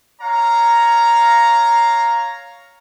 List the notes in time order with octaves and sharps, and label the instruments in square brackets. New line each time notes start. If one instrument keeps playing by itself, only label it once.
[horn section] C#5 F5 A#5